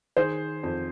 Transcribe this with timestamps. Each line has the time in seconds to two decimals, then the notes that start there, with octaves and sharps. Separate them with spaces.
0.17 D#3 G#4 C5
0.63 F2